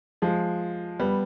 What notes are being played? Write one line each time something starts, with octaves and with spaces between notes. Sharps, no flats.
F3 G#3
G3 B3